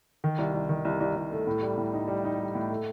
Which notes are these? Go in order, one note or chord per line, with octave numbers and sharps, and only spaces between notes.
D#3
C2
C2
D#3
C2
C2
C2
A3
A2
G3
A2
D#4
G3
D#4
G3
A2
A3